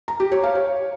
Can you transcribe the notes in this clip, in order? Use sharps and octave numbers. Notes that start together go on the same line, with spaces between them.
A#5
G4
C#5
F5
C#5